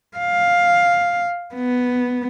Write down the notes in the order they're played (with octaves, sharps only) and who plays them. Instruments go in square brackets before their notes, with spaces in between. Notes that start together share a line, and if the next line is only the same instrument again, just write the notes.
[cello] F5
B3